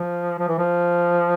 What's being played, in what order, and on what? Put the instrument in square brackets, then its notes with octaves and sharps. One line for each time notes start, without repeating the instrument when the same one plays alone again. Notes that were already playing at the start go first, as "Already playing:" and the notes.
Already playing: [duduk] F3
F3
E3
F3